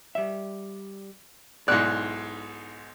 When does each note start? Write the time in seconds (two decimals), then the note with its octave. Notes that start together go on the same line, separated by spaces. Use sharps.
0.15 G3 E5
1.68 B1 G#2 E4 D5 F#6